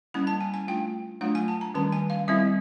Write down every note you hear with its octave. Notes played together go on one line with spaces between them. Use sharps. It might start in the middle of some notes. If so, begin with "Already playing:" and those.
G3 A#3 C#4 E4 B5
A5
G#5
G#5
A3 D4 F4 G5
F#3 A3 D4 F4 F#5
G#5
A5
A#5
D#3 G3 A#3 C#4 A5
G#5
F5
G3 C4 E4 E5